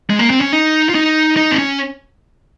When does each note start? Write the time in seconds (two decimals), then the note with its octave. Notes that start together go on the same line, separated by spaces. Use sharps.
0.10 G#3
0.19 A#3
0.30 C4
0.41 C#4
0.52 D#4
0.89 F4
0.95 D#4
1.37 D#4
1.51 C4
1.58 C#4